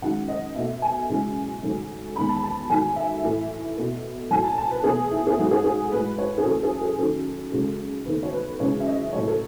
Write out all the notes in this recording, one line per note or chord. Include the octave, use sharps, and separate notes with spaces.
F#2 D#3 G#3 F#5
D#5
B2 A3 E5
G#5
F#2 C#3 E3 G#3
G#2 D#3 F#3 A3
E2 D#3 G#3 B5
A5
A5
G#2 D#3 F#3 A3 G#5
E5
A2 E3 A3
B2 A3
A2 F#3 A3 G#5
A5
A5
B4
E2 B2 A3 G#4
E4
G#4
G#2 F#3 A3 F#4
G#4
G#4
A2 G#3 B4
C#5
G#4
F#2 E3 A3 A4
G#4
A4
F#2 D#3 A3 A4
F#2 C#3 G#3
E2 D#3 A3 B4
C#5
B4
F#2 C#3 E3 G#3 C#5
E5
D#5
A2 F#3 A3 C#5
A4